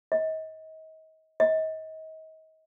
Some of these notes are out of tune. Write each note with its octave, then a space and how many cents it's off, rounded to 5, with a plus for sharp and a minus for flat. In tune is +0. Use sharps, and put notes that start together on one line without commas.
D#5 +35
D#5 +35